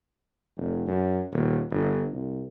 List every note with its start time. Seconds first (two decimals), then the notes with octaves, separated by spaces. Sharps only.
0.56 F1
0.87 F#2
1.32 D#1
1.70 G1
2.13 C2